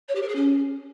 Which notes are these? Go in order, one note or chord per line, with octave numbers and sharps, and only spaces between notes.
C#5
G4
A#4
G#4
C#4